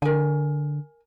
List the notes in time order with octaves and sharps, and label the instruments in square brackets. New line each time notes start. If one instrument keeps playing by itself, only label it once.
[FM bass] D3 [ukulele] A#4 G#5